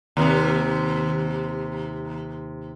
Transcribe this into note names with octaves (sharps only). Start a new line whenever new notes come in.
D#2 C3